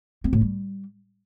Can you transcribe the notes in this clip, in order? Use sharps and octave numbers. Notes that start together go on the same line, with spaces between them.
C4
A2
G3